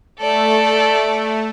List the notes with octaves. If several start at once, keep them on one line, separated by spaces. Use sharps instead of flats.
A3 A4 D5